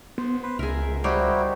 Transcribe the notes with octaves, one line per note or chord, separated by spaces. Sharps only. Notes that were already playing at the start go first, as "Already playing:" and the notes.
B3 C5
B4 C5
C#2 G#4 A#4 E5
G3 D#4 E4 F#4 G4 C5